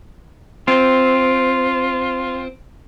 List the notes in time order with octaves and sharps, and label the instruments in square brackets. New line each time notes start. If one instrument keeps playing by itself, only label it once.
[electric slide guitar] C4 [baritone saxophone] F4